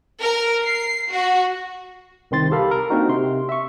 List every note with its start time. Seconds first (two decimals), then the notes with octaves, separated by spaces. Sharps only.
0.21 A#4
0.63 C7
1.09 F#4
2.31 C2 D#3 C4 C6 A6
2.51 G4 A4 A#4 F5 B5
2.71 A#4
2.90 A#3 C4 D4 D#4 F#4
3.09 C3 C6
3.49 E5 C#6